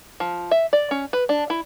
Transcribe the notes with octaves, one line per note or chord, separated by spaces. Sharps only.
F3
E5
D5
C#4
B4
D4
E4